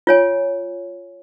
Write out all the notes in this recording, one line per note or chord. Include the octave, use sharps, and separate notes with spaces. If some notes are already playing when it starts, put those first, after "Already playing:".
F4 C#5 G#5